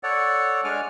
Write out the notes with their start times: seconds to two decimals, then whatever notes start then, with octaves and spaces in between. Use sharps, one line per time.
0.03 A4 C#5 D5 F#5
0.64 G#3 D4 G#5 D6 F6